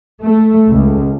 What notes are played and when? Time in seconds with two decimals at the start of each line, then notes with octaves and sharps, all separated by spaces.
0.22 A3
0.70 C#2